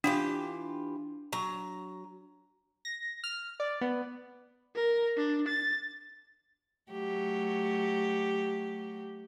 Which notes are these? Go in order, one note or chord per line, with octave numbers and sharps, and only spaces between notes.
E3 D4 F4 G4
F#3 A#5
A#6
F6
D5
B3
A#4
D4
A6
F#3 A3 G4